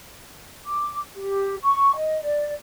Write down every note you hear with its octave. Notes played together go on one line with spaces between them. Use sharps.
D6
G4
C#6
D#5
D5